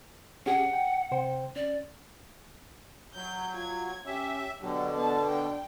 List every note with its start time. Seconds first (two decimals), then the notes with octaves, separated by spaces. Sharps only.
0.46 C#4 G4 G#4 F#5
0.73 G5
1.11 C3 C5 G5
1.56 C#4 D5
3.14 F#3 G6
3.55 F4 G#6
4.06 C#4 G4 E5
4.61 B2 D3 F#3 G4
4.96 B3 A5
5.27 D4 G5